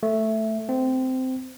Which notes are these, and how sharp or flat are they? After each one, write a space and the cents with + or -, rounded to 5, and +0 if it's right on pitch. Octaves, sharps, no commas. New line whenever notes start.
A3 +0
C4 -15